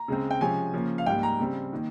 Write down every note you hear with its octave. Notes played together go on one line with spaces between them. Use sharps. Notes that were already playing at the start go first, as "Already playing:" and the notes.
Already playing: A#5
C#3 G#3 C4
G5
C3 F3 G#3 C#4 G#5
C#3 F3 A#3 C#4
F5
G#2 G3 A#3 G5
A#5
C#3 G3 C4
D#3 A#3